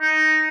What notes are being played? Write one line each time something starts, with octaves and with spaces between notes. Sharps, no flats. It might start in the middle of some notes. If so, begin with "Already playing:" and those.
D#4